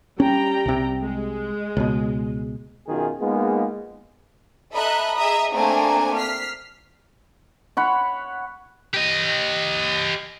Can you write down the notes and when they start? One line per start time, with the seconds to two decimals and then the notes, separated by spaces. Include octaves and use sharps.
0.20 G3 C#4 G5 A#5
0.66 C2 C3
1.02 G#3
1.77 C#2 B2
2.87 B1 F#2 D#3 F4 G#4
3.20 G#3 A#3 B3 D#4 F4 G#4
4.73 A4 D#5 E5 A#5 B5 F#6
5.17 G#4 D#5 E5 A#5 D#6
5.55 A3 A#3 C4 D4 G#5 A#5
6.16 F6 B6 C7
7.77 C#5 F#5 B5
8.94 G4 D#5